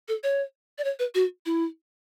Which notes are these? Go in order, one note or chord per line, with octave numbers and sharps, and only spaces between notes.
A4
C#5
D5
C#5
B4
F#4
E4